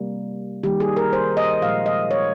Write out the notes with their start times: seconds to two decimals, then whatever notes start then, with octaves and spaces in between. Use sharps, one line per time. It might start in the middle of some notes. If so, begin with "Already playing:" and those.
Already playing: C3 G3 A#3
0.63 D#3 G3 A#3 G4
0.80 G#4
0.96 A#4
1.13 C5
1.37 D#5
1.62 A#2 F3 G#3 F5
1.86 D#5
2.11 C#5